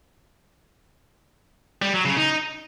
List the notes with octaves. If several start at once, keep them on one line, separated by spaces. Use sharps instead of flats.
G3
F#3
C#3
D#4